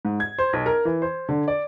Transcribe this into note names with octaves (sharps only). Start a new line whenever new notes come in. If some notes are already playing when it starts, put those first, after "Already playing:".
G#2
G#6
C5
B1
A#4
E3
C5
D3
D5